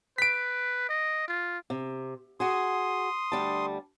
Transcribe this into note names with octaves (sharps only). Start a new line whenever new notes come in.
B4 B6 D7
D#5
F4
C3
F#4 G#4 C6 D#6
D2 G3 A5